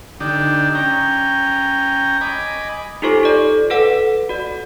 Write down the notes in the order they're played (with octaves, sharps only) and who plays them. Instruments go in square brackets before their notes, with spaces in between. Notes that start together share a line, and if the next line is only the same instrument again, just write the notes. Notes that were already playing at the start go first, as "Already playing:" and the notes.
[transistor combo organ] D3 D4 D#4 G4
C#4 G5 A#5
D#5 G#5 B5 D6
[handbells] D#4 F4 G4 A4 C5 C#6
A4 D5
A4 B4 F#5
F#4 D5